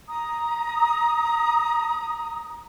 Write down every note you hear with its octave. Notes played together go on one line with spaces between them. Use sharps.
A#5 D#6